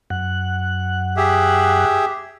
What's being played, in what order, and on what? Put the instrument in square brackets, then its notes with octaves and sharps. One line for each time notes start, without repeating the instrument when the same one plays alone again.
[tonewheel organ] F#2 F#5 F#6
[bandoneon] G4 G#4 E5